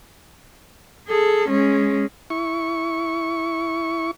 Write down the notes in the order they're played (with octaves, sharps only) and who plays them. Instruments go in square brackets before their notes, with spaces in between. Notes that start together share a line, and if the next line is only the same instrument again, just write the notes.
[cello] G#4 A4
G#3 C#4
[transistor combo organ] E4 C#6